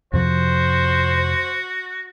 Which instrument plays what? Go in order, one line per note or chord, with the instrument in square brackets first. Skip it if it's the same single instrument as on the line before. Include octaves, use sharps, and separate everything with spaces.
[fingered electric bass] F2 C3 F3 [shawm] F#4 [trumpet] C5